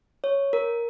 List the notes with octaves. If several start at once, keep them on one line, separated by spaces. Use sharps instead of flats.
C#5
A#4